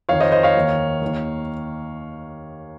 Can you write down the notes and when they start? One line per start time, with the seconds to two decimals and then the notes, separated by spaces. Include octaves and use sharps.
0.09 F2 D#3 C#5 F5
0.21 C5 D#5
0.32 C5 D#5
0.43 C#5 F5
0.56 D#2 D#3
1.02 D#2 D#3